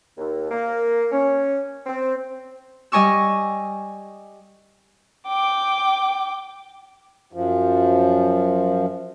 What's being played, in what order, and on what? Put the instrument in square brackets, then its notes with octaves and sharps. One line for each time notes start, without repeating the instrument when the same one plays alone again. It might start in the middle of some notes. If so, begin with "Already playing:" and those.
[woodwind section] D#2
A#3
C#4
C4
[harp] G3 D#5 G#5 C#6 E6
[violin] G5 D6
[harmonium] F#2 F3